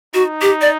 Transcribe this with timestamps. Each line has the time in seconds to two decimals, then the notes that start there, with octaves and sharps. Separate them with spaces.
0.14 D#4 F#4
0.42 G4
0.61 D5